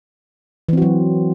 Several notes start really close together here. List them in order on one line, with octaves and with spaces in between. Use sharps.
E3 C4 F#4 F#3